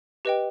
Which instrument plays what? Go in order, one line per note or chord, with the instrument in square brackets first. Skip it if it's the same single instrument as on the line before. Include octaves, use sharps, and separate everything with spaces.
[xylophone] G4 B4 D#5 G5